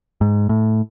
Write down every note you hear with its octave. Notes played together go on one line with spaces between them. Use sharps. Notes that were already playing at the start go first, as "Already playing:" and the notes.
G#2
A2